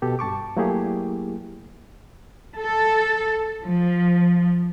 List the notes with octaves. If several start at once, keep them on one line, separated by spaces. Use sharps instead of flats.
B2 G4 A4
G2 A5 C#6 D6
F#3 A3 A#3 E4 G4 G#4
A4
F3